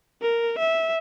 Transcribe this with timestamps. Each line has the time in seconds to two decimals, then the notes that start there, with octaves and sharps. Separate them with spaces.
0.21 A#4
0.58 E5